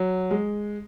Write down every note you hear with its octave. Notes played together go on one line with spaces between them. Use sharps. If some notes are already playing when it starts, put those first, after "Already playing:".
Already playing: F#3
G#3